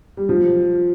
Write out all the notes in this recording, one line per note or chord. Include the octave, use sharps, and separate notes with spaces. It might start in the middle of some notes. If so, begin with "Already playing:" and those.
G3
F3